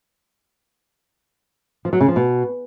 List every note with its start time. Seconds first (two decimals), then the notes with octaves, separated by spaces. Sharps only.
1.85 F3
1.93 F#3
2.01 C#3
2.08 F3
2.16 B2